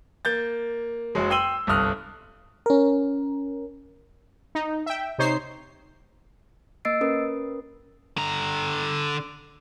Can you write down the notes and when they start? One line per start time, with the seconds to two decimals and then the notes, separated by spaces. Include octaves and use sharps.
0.25 A#3 G6 A6
1.15 F#1 F#3 G#3
1.30 G5 C6 E6 D#7 F#7 G7
1.67 G1 C2 A4 D#6 F6 F#6
2.66 C#4 A#4
4.55 D#4
4.86 E5 G5
5.18 C3 D#4 C5 C#5 C7
6.85 A#3 D#5 E6 A6 C7 D7
7.01 C#4 A#4 B4 D#6
8.17 D3 A#5